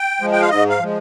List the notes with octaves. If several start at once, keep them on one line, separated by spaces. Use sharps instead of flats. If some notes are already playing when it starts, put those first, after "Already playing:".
Already playing: G5
F3 G#3
G5
F5
G#2 D#5
F5
F3 G#3